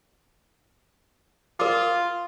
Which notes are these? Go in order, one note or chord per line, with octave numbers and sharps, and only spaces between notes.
F4 A#4 D6